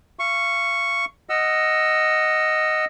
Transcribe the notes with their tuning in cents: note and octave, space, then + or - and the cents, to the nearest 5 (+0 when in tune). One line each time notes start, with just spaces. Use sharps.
F5 -30 C#6 +0
D#5 +0 F#5 +0 E6 +20